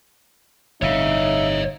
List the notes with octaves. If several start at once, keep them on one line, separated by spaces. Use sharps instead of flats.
G1 A2 D#4 C#5 E5 F5